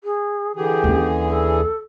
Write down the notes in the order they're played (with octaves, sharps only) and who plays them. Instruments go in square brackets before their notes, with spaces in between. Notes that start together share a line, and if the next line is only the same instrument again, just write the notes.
[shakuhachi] G#4
[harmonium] D3 E3 G#4 [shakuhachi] G4
[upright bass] D#2 C#4
[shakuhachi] A4